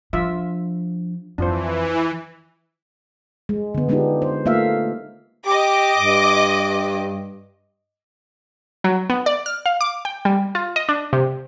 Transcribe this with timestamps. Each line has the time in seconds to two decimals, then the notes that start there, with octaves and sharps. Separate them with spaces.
0.13 F3 D4 F4 E5
1.38 F2 E3 D4 F4 C5
3.49 G#3
3.74 D3 B3
3.89 G#3 B3 D4 D#4 F4 G4
4.22 C5
4.45 A3 A#3 F4 E5 F5
5.46 G4 D#5 D6
5.98 G2
8.84 F#3
9.10 B3
9.26 D5
9.46 F6
9.66 F5
9.81 D6
10.05 G5
10.25 G3
10.55 F4
10.76 D#5
10.89 D4
11.13 C3